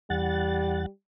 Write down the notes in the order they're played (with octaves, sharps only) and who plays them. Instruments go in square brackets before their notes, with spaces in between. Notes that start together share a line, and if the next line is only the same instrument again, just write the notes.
[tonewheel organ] E2 F#5 A6 [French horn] G3